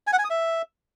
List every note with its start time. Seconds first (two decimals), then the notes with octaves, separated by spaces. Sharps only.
0.07 G#5
0.13 F#5
0.19 G#5
0.24 D#6
0.30 E5